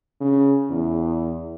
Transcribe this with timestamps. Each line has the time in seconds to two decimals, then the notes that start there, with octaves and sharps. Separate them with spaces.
0.21 C#3
0.70 E2